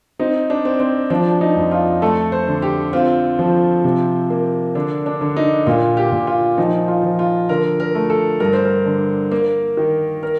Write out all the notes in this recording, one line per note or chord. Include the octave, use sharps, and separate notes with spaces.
C4 D#4
D4
C4
C4
F3 D4
D4
D#4
F2
F4
A3 A4
C5
D3
G4
C4 F4
F3
C3
A#3
D3 D4
D4
D3
D#4
A#2 F4
G4
A#2
F4
F3 D#4
F4
F3
F4
D3 A#4
A#4
A3
A4
G2 A#4
C5
A#4
D3
A#3
D#3
A#4